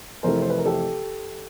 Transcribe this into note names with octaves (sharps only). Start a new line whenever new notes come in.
F2 C3 E3 A3 C4 A#4 C5
C5
B4
A#4
G4 A4